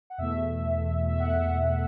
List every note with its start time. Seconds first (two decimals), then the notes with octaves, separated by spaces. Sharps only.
0.10 F#5
0.18 E2 B2 A3 E5
1.09 E5
1.20 F#5